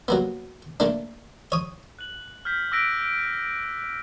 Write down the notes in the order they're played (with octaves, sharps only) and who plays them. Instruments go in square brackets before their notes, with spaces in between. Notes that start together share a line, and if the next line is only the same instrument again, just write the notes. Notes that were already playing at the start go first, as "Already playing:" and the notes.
[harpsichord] F#3 A#3 B3
A3 A#3 D4
C#5 D#6
[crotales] F#6 F#7
F6 G6 B6
D6 E6 F#6 A#6 B6 D7